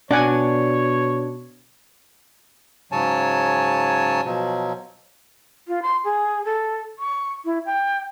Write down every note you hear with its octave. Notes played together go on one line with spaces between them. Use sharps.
B2 D4 C#5 D5 F#5 G#5
G#2 C#3 F#3 C#5 G#5 A5
B2 F3 F#3
F4
C6
G#4
A4
C#6
E4
G5